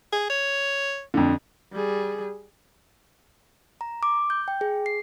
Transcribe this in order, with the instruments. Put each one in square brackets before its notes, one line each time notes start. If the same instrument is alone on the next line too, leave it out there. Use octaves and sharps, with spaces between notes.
[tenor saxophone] G#4
C#5
[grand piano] F2 D3
[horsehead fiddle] G3 G#4
[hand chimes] A#5
D6
G6
G5
G#4
C7